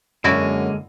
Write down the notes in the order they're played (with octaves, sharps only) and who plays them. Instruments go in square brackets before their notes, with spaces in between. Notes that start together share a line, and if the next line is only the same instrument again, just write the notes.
[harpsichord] F#2 [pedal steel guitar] D3 G#3 A#3 [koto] E4 F#4 D5